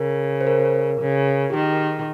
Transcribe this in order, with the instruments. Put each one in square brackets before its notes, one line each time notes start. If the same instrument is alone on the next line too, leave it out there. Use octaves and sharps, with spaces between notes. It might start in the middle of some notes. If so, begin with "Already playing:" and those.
Already playing: [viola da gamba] C#3 [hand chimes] A#4
[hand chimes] C5
A#4
[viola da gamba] C#3
[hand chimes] G4
[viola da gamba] D#3 [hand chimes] G#4